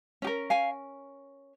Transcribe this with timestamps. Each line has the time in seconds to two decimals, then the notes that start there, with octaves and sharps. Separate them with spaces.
0.22 C#4 G4
0.27 A#4
0.50 F5 G#5